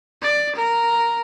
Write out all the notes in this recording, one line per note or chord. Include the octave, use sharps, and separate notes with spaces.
D5
A#4